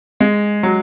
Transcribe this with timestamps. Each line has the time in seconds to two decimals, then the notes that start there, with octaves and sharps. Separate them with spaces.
0.20 G#3
0.63 F#3